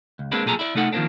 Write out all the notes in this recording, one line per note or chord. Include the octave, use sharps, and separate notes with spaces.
C#2
G#3 A#3 C4 D4 B4
B1 A#2 G#4 A4 A#5
E4 D5
C3 A3 D#4 A4 F#5
D#3 F3 F#3 A#3 C4 D4